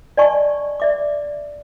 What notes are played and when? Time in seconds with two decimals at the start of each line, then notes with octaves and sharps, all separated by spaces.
0.17 D5 D#5 G#5 A5 C#6
0.80 D5 E5 D6